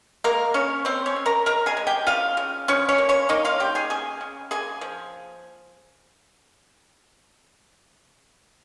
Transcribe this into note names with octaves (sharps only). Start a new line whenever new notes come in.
G#3 A#3 A#4
C#3 C#4 C#5
C#3 C4 C5
C#4 C#5
C#3
A#4 A#5
G#3 A#4 A#5
G#4 G#5
G#3
G4 G5
C#3 F4 F5
C#3
F3 C#4 C#5
C#4 C#5
A#3
C#4 C#5
A#3 D#4 D#5
F4 F5
C#3 G4 G5
G#4 G#5
C#3 G#4 G#5
C#3
A#3 G#4 G#5
F3